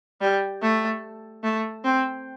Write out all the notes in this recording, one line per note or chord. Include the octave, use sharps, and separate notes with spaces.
G3
A3
A3
C4